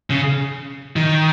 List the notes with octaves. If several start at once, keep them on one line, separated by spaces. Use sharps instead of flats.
C#3
D#3